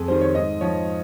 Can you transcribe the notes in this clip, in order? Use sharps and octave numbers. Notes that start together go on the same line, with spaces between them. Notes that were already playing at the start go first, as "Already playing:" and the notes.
Already playing: F2 G#4
D#3 G3 C5
C#5
G#2 D#5
F3 C#5